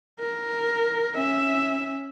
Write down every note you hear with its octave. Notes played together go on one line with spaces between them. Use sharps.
A#4
C#4 E5